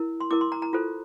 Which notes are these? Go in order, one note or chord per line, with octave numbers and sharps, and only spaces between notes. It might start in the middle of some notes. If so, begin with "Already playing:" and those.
Already playing: E4 A#4
C6
E4 A#4 D6
C6
A#5
A#5
F4 A4 C5